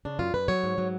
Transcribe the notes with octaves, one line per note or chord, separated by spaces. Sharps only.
C#3 D4
F#2 F4
F#2 B4
F#3 C#5
G#2
F#3